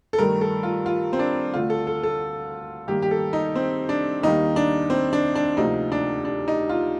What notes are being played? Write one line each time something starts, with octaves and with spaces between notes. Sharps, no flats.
A4
G2 D#3 A3 A#4
A4
F4
F4
C4
D4
D2 D3 A3 F4
A4
A4
A4
G2 D#3 A#3 G4
G4
A4
D#4
C4
D4
D#2 D#3 G3 A#3 D#4
D4
C4
D4
D4
D2 C3 F3 A#3 D#4
D4
D4
D#4
F4